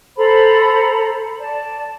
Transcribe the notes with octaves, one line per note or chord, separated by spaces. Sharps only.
A4 C5 A#5 B5
D5 A5